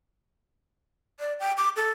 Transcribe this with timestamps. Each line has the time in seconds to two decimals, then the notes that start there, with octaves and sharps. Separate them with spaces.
1.20 D5
1.40 G5
1.58 D6
1.76 A4